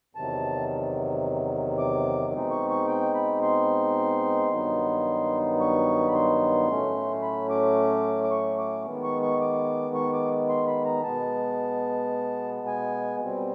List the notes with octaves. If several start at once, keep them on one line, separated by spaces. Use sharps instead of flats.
E2 C3 D#3 F#3 A5
D6
B2 G#3 C4 D#4
C#6
C#6
G5
B5
C6
G2 D#3 F#3 B3 D#4
C#6
B5
C6
A2 F#3 A3 C#4
B5
D6
D6
C#6
D6
D#3 G#3 B3
C#6
C#6
D6
C#6
D6
C6
B5
A#5
B2 G#3 B3 A5
G#5
B2 G3 C4